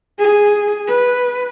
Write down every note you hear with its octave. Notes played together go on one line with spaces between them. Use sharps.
G#4
B4